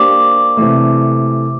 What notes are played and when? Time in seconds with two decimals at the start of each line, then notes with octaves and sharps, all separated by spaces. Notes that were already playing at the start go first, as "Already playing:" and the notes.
Already playing: A#3 D4 G4 C5 D6
0.57 C3 E3 A3